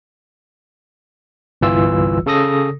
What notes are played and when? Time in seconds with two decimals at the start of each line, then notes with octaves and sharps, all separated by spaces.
1.61 G1 C2 E3 F4 E6
2.26 C#3 A4 D#6 A#6